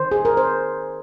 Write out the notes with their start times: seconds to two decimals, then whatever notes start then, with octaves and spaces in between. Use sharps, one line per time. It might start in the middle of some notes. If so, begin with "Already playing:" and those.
Already playing: D#3 C5
0.11 G#4
0.25 A#4
0.37 C5